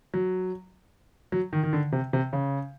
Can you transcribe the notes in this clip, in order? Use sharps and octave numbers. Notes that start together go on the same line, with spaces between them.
F#3
F#3
D#3
D#3
D3
C3
C3
C#3